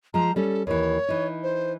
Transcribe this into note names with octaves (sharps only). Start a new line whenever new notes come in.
F3 G#3 A#5
G3 C#4 A4
D#2 E3 C#5
E3 D#4
C5